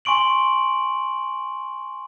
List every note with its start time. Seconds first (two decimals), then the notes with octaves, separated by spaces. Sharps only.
0.05 G#5 C6 C#6 D7 F#7